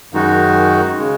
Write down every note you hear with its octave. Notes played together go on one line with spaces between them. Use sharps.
F#2 D#3 G#3 D#4 F#4
C#3 G#3